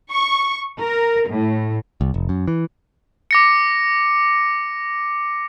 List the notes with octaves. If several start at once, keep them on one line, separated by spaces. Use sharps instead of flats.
C#6
A#4
A2
C2
F1
F#2
E3
D6 A#6 C#7